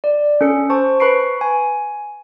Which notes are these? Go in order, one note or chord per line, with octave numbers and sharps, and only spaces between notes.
D5
C#4 A4 C#7
C5 A5 C#6
B4 B5 C#6 C7 D7
G#5